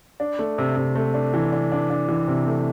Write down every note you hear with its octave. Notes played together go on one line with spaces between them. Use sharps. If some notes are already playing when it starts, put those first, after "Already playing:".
D4
A3
C3
C3
A3
D4
E3
D4
D4
D4
E3
C3
A3